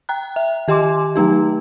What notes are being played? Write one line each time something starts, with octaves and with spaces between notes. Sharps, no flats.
G5 A#5 F#6
E5
D#3 G4 D#5 G#5 C6 D6
F#3 A3 D#4 G4